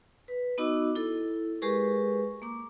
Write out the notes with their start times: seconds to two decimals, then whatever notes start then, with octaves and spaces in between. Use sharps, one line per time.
0.28 B4
0.58 B3 D#4 F#4 D#5 D6 E6
0.95 E4 A4
1.62 G#3 G4 G#4 A#4 B4 C#6
2.42 A#3 D6